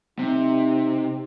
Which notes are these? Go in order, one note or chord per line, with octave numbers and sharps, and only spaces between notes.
C3 D#4